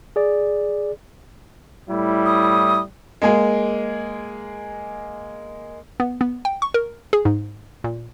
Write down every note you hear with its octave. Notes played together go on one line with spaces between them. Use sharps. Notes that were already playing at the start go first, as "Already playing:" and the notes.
G#4 D5
A2 G3 E4
D#6
G#3 A#3 G#4
B3
B3
G5
C#6
A#4
G#4
G#2
A#2